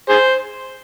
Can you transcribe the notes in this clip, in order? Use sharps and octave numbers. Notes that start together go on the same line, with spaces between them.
G#4 C5